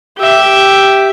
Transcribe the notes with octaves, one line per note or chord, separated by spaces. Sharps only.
G4 E5